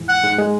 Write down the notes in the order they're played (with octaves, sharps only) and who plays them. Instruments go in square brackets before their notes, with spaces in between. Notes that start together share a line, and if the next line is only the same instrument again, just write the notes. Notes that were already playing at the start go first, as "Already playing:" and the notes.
Already playing: [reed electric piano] E2 G#2 E3
[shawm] F#5
[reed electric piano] G#2 G#3
G#3